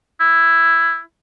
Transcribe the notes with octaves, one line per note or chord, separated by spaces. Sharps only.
E4